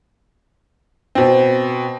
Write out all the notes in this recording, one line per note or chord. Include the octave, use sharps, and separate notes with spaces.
B2 C4